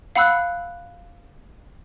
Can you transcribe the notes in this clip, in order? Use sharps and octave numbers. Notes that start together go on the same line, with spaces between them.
F5 F#5 B5 E6 F#6